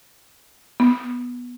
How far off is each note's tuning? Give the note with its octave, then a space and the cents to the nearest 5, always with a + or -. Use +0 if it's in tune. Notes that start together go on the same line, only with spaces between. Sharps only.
B3 -10